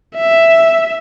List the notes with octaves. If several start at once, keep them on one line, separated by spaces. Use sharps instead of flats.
E5